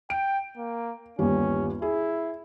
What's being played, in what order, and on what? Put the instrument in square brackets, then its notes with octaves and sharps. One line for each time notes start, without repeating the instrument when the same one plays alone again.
[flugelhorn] G5 [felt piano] D7
[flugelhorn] A#3
[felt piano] G1 D#2 G3 [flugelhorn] C#4
[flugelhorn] E4 [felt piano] G#4